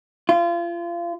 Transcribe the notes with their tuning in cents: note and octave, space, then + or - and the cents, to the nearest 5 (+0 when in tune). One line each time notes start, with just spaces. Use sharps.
F4 -30